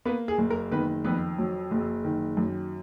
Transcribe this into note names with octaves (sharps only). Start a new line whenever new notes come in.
A#3 B3 B4
G#4
F#1
A#4
D#3 B3 B4
F2 B3 B4
F#3
F#1
D#3
F#2